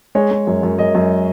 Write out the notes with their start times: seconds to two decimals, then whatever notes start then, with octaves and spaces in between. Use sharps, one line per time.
0.15 G#3 C#5
0.31 G#3
0.47 F#2
0.63 F#2
0.79 F#2 D#5
0.95 F#2